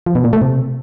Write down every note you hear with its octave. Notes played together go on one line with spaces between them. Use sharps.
F3
B2
A#2
A3
C3